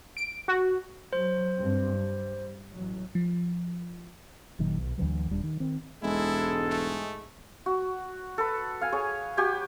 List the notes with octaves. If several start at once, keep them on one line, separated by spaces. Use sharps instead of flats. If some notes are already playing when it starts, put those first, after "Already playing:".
D7
F#4
F#3 C5
G2 C4
G3
A1 F#3
F3
F#1 A#2 D#3 F#3
B1
D2 D3 E3 F#3
D#1 G3 D4
D#3
D#3 C4
E1 G#2 G#3 E4 A4
A3
F#4
A4 B4
F5 G#5
G#4 C#5
F#4 G4 G#5